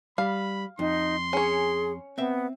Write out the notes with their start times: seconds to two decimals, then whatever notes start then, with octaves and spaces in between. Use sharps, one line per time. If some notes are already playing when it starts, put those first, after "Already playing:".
0.18 G3 F5 B5
0.79 F2 D#4 C6
1.33 C#4 G#4 C#5
2.18 B3 C4 E5